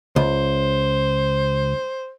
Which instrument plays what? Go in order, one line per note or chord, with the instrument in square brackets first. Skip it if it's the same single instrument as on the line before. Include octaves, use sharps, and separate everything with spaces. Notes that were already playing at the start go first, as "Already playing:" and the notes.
[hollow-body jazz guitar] C#2 [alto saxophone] C5